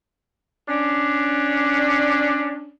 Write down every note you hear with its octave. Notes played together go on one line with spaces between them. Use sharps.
C#4 D4